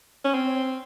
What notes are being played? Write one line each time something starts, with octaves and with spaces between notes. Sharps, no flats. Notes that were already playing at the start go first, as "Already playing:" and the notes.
C#4
C4